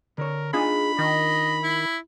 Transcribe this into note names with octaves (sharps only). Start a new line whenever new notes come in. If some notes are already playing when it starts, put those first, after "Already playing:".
D3 A#4 C#5
D4 D#4 F4 G#4 B5
D#3 D#5
E4